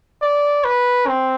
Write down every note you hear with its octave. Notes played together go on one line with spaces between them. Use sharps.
D5
B4
C4